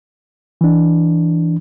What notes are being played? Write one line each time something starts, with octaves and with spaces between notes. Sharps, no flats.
E3 D4